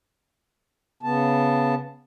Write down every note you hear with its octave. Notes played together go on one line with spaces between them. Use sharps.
C#3 B3 A5